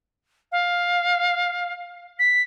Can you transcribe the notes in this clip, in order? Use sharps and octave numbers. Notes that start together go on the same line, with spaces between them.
F5
B6